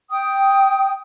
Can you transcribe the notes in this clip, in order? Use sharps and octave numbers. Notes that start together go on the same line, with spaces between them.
G5 D#6